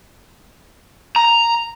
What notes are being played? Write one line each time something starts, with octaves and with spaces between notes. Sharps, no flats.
A#5